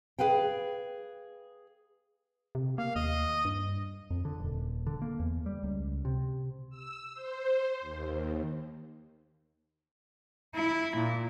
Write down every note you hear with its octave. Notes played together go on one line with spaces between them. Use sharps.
G#4 B4 F5 G5
C3
A#3 F5
D#2 D#5
G2
F2
D3
D#1
D3
A#3
E2
G3
C#2
C3
E6
C5
D#2
E4
A#2